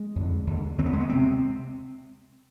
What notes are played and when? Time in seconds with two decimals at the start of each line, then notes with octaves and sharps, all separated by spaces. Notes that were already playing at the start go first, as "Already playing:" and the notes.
Already playing: G#3
0.16 F2 D3
0.47 D#2 D3
0.78 D#2 D3 C4
0.86 B3
0.93 G#3
1.00 B3
1.09 C3 C4